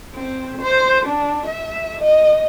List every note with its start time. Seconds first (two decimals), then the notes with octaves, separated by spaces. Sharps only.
0.15 C4
0.62 C5
1.06 D4
1.47 E5
2.01 D#5